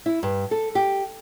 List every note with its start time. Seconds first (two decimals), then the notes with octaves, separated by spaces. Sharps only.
0.06 E4
0.23 G2
0.51 A4
0.75 G4